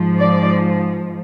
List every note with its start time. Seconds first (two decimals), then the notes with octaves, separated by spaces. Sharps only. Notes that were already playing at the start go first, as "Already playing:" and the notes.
Already playing: G#2 F3
0.18 D5